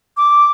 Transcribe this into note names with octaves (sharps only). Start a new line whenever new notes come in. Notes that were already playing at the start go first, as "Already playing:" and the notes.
D6